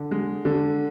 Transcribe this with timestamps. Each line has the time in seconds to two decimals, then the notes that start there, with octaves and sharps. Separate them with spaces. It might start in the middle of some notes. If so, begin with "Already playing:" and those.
Already playing: D3
0.11 G#3
0.45 D3